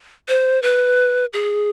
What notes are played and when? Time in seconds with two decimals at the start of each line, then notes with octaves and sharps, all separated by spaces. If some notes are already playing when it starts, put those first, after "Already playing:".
0.28 C5
0.63 B4
1.33 G#4